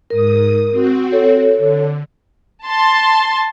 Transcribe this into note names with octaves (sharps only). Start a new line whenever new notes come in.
G#2 A#4 D#6
C4 F#4
A4 C#5
D3
A5 C6